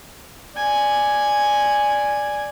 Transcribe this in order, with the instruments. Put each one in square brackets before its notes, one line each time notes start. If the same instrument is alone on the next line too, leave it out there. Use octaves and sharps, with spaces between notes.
[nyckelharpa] D5 G#5